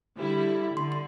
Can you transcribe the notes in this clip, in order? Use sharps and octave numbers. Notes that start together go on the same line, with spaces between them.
D3 G3 E4
D3 C6
C6